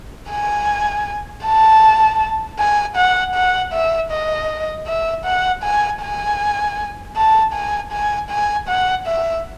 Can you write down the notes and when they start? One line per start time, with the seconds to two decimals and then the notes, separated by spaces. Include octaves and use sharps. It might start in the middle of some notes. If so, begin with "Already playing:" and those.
0.30 G#5
1.45 A5
2.59 G#5
2.96 F#5
3.35 F#5
3.73 E5
4.11 D#5
4.87 E5
5.25 F#5
5.63 G#5
6.02 G#5
7.17 A5
7.54 G#5
7.92 G#5
8.30 G#5
8.68 F#5
9.07 E5